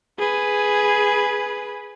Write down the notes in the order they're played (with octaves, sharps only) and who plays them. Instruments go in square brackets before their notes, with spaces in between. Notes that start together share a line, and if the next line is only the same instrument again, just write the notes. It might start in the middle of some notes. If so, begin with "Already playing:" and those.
[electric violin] G#4 B4